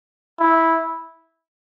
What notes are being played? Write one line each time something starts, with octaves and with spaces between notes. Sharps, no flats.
E4